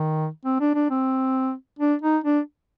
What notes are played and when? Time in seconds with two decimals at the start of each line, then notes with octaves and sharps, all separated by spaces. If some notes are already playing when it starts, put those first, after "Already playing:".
Already playing: D#3
0.45 C4
0.61 D4
0.75 D4
0.90 C4
1.79 D4
2.02 D#4
2.24 D4